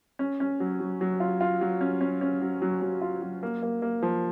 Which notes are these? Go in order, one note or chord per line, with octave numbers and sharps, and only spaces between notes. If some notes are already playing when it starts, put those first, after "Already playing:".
C#4
C#4
F#3
F#3
F#3
F4
F4
F#3
C#4
C#4
C#4
F#3
F#3
F#3
F4
F#3
A#3
A#3
A#3
F3